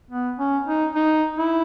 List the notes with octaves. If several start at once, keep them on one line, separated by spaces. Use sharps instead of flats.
B3
C#4
D#4
D#4
E4